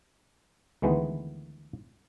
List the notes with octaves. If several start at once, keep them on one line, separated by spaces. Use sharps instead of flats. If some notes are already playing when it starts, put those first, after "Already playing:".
D2 D#3 E3 G#3 B3